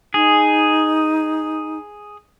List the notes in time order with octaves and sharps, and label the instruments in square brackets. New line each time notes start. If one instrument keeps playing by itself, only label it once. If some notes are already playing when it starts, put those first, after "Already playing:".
[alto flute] D#4 [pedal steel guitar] G#4